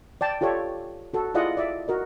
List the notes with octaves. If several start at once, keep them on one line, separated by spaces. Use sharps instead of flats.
D5 G5 A5
F4 G4 A4 C#5 D5
F#4 A4
E4 F4 G#4 D5 D#5 F#5
D5 E5
F#4 A#4 D#5